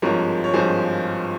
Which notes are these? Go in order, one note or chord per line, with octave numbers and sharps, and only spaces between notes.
G#1 G2 F3 G#3 A#4 C#5
C#5
G#1 G2 F3 G#3 G#4 C5